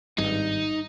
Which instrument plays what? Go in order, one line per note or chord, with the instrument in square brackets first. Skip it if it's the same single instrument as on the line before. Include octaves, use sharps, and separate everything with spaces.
[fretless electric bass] G#1 G2 [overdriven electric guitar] D#4